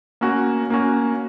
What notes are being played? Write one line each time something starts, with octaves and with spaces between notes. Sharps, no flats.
A#3 C#4 F#4
A#3 C#4 F#4